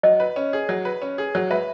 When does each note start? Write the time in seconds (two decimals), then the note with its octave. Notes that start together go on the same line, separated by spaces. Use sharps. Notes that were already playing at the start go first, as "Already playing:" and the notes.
0.03 F#3 D#5
0.20 B4
0.36 C#4
0.53 G#4
0.69 F#3
0.85 B4
1.02 C#4
1.18 G#4
1.35 F#3
1.51 B4 E5